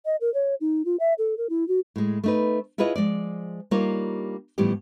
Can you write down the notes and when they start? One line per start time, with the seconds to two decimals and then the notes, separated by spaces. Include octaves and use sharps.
0.06 D#5
0.21 A#4
0.34 C#5
0.61 D#4
0.85 F4
1.00 E5
1.18 A4
1.38 A#4
1.50 E4
1.68 F#4
1.96 A2 G#3
2.24 A3 D#4 B4
2.78 E4 F4 G#4 B4 C#5 D#5
2.96 F3 G#3 D5
3.71 G3 A#3 D4 D#4 F4 C#5
4.58 A2 E3 F3 G3 B3 G4